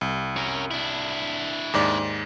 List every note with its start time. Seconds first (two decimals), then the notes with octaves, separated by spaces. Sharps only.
0.01 C2
0.36 C#4 A#4
0.71 D4 E4
1.73 D#2 G#2 D5